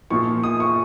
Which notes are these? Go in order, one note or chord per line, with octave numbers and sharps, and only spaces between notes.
A#2 F3 C#6
D#6
C#6